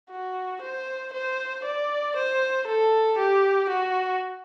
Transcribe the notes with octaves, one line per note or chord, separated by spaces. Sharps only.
F#4
C5
C5
D5
C5
A4
G4
F#4